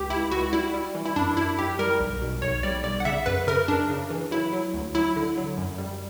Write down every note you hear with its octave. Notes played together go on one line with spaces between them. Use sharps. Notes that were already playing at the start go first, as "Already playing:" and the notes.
Already playing: C#2 G4
C#2 E4
C#2 F#4
G3 E4
G3
E3
E4
F#2 D4
F#2 E4
F#2 G4
G3 A#4
B1
B2
B1 C#5
G3 D5
B1 D5
F#5
C#3 E5
F#2 B4
C#3 A#4
F#2 D4
C#3
E3
F#3 E4
F#3
D2
F#3 E4
D3
F#3
F#2
G3